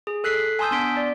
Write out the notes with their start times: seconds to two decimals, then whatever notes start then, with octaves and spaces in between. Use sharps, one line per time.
0.07 G#4
0.24 A4 F#6 B6 C7
0.59 G#5 A5 C6 D#6 E6 G6
0.71 B3 D4 C6 B6 D7
0.97 D5